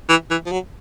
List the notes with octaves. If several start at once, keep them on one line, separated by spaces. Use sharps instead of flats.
E3
E3
F3
F#3